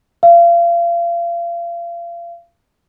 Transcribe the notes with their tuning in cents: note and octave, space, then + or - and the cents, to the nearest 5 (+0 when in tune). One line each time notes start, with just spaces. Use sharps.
F5 -35